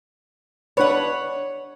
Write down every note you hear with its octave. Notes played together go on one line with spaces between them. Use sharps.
D4 B4 C#5 F#5